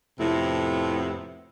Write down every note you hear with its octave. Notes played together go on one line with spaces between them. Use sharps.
F2 A2 C3 B3 E4